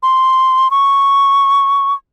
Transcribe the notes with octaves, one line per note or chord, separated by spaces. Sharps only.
C6
C#6